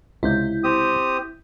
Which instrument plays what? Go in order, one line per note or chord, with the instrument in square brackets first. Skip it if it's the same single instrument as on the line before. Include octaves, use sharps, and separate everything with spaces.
[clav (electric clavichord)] C#2 C3 [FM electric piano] E4 G6
[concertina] C4 G4 D#6